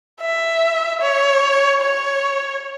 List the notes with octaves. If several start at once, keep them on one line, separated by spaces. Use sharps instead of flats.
E5
C#5
C#5